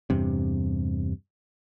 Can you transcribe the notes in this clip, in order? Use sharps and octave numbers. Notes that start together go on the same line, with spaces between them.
E2 G2 C3